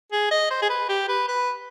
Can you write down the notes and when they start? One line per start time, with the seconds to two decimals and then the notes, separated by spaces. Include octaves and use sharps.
0.12 G#4
0.31 D#5
0.50 C5
0.62 G#4
0.70 B4
0.89 G4
1.09 B4
1.28 B4